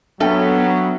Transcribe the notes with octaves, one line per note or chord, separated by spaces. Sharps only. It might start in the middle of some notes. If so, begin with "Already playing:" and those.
F#3 B3 D4 A4 E5 G5